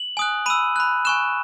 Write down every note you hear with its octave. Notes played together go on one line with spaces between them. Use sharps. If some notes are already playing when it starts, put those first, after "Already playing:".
Already playing: F#7
G#5 D#6 F#6
B5 E6 D#7
B5 F#6
G#5 C#6 F#6 E7